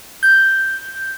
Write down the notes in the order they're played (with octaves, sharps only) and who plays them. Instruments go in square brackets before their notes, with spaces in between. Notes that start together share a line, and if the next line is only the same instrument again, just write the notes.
[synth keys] G6